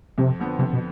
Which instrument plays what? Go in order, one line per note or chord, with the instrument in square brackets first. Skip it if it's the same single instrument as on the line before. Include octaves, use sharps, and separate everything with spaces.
[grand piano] F2 [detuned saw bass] C3
[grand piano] D3 F3 B3
[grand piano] F2 [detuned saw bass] C3
[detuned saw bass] B2